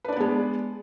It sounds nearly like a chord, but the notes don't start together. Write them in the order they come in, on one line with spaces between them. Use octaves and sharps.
B4 D4 D5 B3 G#3